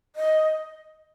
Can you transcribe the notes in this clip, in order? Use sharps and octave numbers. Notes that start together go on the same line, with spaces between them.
D#5